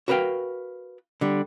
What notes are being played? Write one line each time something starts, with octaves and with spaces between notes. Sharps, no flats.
F#4 A#4 B4 D#5 F5 G5
D3 G3